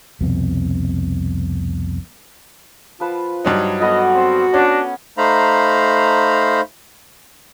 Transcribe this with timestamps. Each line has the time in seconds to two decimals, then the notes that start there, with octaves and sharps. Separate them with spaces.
0.21 C2 F2 B2
3.00 F3 F4 B4 A5
3.45 G2 F#3 D#4
3.81 A3 B3 F#4 D#5 F#5
4.15 C4
4.54 C#4 D4
5.18 A3 D#4 C5 F5 A#5 B5